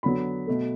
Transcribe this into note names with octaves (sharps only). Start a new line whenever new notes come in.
D3 F#3 B3 B5
B2 A3